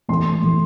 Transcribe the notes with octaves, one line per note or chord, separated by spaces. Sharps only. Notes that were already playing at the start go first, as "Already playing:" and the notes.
A2 E3 A3 C6
A2 E3 A3